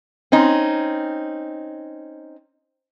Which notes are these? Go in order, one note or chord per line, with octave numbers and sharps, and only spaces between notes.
C4 C#4 D#4